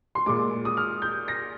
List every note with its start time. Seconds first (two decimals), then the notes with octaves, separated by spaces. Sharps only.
0.15 C6
0.26 A#2 G#3 D6
0.65 D#6
0.77 F6
1.02 G6
1.28 A#6